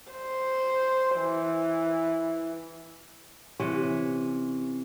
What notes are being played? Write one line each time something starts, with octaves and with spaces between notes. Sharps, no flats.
C5
E3
C3 E3 C#4 E5